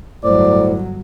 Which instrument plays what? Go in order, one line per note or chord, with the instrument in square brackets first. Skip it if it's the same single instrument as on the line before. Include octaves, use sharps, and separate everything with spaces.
[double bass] G1 F#3 [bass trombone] A2 [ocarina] C5 [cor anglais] D5